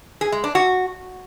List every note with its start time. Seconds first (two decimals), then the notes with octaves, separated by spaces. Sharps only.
0.21 G#4
0.32 G#3
0.44 D4
0.55 F#4